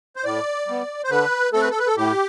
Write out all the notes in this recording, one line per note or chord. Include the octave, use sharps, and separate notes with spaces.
C5
A2 D5
G3 B3
C5
D3 B4
A3 C4 A4
B4
A4
B4
A4
A2 G4